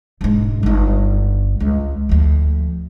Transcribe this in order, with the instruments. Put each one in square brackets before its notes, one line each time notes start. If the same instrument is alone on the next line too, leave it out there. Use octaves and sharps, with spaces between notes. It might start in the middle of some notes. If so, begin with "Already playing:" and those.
[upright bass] E1 G#2
G1 D#4
C#2
D2 F3